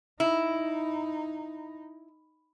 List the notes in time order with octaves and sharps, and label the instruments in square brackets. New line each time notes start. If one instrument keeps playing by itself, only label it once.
[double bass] D#4 [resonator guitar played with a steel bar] E4